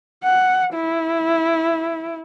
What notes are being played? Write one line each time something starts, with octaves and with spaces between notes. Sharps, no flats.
F#5
E4